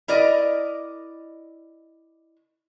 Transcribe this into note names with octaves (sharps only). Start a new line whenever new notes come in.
E4 A#4 D5 D#5